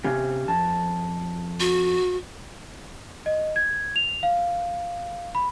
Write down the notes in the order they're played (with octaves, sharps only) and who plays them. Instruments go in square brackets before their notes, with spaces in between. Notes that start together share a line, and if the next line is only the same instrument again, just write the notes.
[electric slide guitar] C3 C#4 G4
F2 A5
[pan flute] F#4
[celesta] D#5
G#6
F7
F5
B5